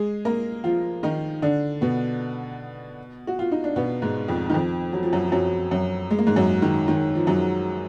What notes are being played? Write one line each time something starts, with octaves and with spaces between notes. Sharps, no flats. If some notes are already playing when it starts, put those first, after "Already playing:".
Already playing: G#3 G#4
A#3 A#4
F3 F4
D#3 D#4
D3 D4
B2 B3
F#4
F4
D#4
D4
B2 B3
G#2 G#3
F2 F3
D#3
F2 F3
F#3
F3
F#2 F#3
F3
F#2 F#3
F#2 F#3
G#3
A#3
G#2 G#3
F#2 F#3
D#3
D#3
F3
F#2 F#3